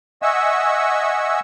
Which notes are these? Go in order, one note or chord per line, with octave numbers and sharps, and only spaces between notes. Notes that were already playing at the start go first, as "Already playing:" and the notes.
D#5 E5 F#5 G#5 C#6 E6